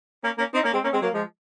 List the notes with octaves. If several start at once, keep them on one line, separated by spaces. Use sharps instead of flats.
A#3 C#4
A#3 C#4
C4 D#4
A#3 C#4
G#3 C4
A#3 C#4
G#3 C4
F#3 A#3
F3 G#3